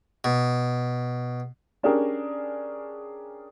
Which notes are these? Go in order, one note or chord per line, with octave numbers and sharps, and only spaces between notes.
B2
C#4 D4 G4 G#4 A#4